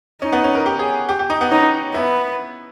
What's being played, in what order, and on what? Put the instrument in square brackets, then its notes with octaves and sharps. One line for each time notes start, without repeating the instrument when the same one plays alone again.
[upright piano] C#4 [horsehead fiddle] D#4
[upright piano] B3
C#4
A#4
G4
G#4
G4
G4
D#4
B3
[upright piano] C#4 [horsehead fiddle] D#4
[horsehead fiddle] B3 [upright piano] E4